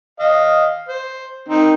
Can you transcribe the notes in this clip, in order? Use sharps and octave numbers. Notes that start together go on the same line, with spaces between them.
D#5 F5
C5
D#3 C4 D#4